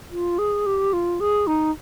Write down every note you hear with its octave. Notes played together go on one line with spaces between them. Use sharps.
F4
G#4
G4
F4
G#4
D#4